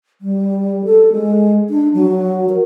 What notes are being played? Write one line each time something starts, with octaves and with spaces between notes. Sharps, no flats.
G3
A4
G#3
D4
F#3
A#4